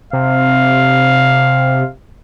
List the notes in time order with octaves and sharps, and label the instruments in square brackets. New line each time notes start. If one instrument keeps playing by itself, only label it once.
[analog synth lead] C3 [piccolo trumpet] F5